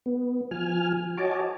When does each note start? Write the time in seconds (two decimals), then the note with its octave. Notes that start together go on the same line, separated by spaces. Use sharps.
0.06 B3
0.51 F3 G#5 F6
1.17 F#4 C#5 D#5 G#5 A5 D6